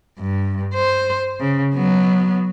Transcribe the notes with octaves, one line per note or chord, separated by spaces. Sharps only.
G2
C5
C#3
F#3 B3